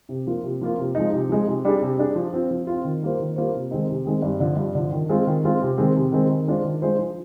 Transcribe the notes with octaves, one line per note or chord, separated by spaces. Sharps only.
C3
F3 A#3 F4
C3
F3 A#3 F4
C3
F3 G#3 D#4
C3
F3 G#3 D#4
C3
G3 D4 G#4
C3
G3 D4 G#4
F3
C4 F4
F3
C4 F4
D#3
G3 A#3 F4 C5
D#3
G3 A#3 F4 C5
C3
D#3 G#3 C4 D#4
C3
D#3 G#3 C4 D#4
G2
D3 F3
G2
D3 F3
D#3
G#3 C4 F4
D#3
G#3 C4 F4
C3
D#3 G#3 C4
C3
D#3 G#3 C4
D#3
G#3 D4 F4 C5
D#3
G#3 D4 F4 C5
F3